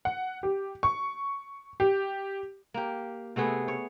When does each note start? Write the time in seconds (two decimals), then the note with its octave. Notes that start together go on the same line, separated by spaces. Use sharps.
0.05 F#5
0.43 G4
0.83 C#6
1.80 G4
2.74 A#3 G4
3.36 C3 A3 B3 G#4
3.68 C#5